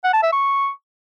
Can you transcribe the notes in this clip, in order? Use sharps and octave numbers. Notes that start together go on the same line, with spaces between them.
F#5
A5
E5
C#6